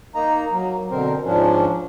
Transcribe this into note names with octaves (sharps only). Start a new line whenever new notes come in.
A#3 D#4 A#5
F#3 A#3
B2 D3 C4 A#4 C5
G#2 F3 C#4 D4